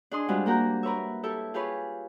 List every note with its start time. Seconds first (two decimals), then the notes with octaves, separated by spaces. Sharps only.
0.11 D4 G#4 D#5 C6 D#6
0.28 G3 G#3 C4 D4 F4 F#4
0.46 A#3 F#4 A#4 A#5 G6
0.83 A#4 B4 C#5 E5
1.23 E4 G4 A4 E5
1.54 F4 G4 G#4 B4 C#5